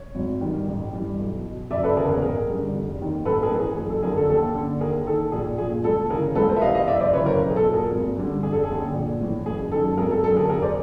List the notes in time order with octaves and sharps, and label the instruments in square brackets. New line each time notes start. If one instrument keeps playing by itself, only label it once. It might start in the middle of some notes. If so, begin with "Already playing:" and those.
Already playing: [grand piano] C#5
G#1
G2 D#3
A1
G2 E3
B1
B2
F#1 D5 E5
A4 B4
E2 C#3 G#4 A#4
G#4 A#4
A1 G#4 A#4
G2 D3
F1
D#2 D#3
A1 A4 B4
G#4 A#4
A2 E3
G#4
F#1 G#4
A4
F2 D3 G#4 A#4
A4
D#2 A4
D3
D#2 G#4 A#4
D#3 A4
A#1 G#4
A#2 G#4
C#2 A4
C#3 E3 G#4 A#4
C#2 A4 B4
A#4 C5
E5
C3 E3 D#5 F5
D#5 F5
F#1 D5 E5
C5 D5
F#2 C#3 E3 B4 C#5
A#4 C5
B1
G#4
A4
A#2
G#4 A#4
G#1
G2 D3
F1 G#4
A4
G#4
D#2 D3
A#1
A2 E3
F#1 G#4
F#2 D#3 A4
G#1 G#4 A#4
A4
F#2 A4
D3
G#4 A#4
F1 G#4 A#4
C5 D5